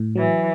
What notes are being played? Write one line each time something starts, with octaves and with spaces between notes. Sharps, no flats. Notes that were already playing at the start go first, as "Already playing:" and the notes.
Already playing: A2
E3 F#3